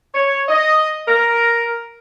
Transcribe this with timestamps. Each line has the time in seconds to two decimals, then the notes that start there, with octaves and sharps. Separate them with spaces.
0.14 C#5
0.48 D#5
1.08 A#4